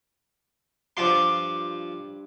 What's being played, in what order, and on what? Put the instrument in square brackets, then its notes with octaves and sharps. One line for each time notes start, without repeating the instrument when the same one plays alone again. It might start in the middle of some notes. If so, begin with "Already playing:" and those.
[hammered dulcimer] G2 D6 [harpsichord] F3 F4 C6